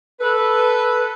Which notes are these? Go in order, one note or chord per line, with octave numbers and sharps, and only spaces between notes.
A4 B4